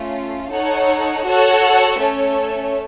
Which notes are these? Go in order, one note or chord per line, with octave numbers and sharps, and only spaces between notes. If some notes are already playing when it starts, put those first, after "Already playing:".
Already playing: A3 C#4 F4
D#4 A4 C#5 F#5
F#4 A4 C#5 F#5 A5
A3 C#4 A4 C#5